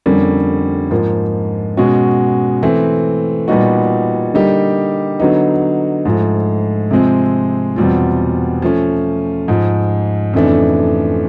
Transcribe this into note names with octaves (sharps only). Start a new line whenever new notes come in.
F2 D3 G3 A#3 C#4
G#2 F3 A#3
B2 G#3 C#4 F#4
E3 A3 C4
A#2 G3 B3 D#4 F#4
D3 G3 A#3 D#4 G4
D3 F#3 B3 D#4
G#2 F3 A3
C3 F3 G#3 C4
E2 B2 G3 C4 F4
F3 A3 C#4
G#2 F3 G#3
F2 C#3 E3 A3 D4